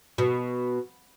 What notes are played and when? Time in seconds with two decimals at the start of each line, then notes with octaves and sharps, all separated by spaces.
0.18 B2